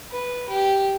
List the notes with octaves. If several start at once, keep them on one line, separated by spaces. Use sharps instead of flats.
B4
G4